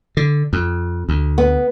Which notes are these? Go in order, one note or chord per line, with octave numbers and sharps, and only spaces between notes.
D3
F2
D2
B3